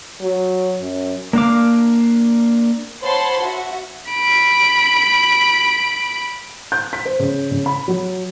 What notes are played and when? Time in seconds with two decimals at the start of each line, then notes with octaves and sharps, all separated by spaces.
0.22 F#3
0.80 F#2
1.33 A#3 D4 F5 D6
3.03 C5 C#5 F#5 A5 B5 C6
3.39 F#4 E5
4.11 B5 D7
6.72 G6
6.93 B6
7.05 C5
7.19 C#3
7.51 C#3
7.66 B5
7.88 F#3